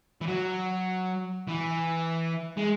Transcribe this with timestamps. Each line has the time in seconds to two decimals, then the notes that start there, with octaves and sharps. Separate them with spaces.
0.22 E3
0.27 F#3
1.48 E3
2.57 G#3